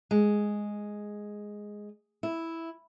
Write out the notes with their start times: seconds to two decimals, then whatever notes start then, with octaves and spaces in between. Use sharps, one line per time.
0.11 G#3
2.23 E4